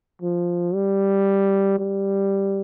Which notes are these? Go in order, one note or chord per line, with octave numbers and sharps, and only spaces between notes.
F3
G3
G3